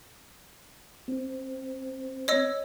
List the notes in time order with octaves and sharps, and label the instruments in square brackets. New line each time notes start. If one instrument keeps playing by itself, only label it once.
[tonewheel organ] C4
[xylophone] C#5 D#5 E6